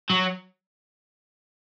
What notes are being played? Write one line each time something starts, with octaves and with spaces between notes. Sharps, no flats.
F#3